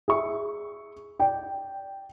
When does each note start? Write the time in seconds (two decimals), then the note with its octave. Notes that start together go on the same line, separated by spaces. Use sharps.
0.08 G#4 E5 C#6
1.19 D5 G5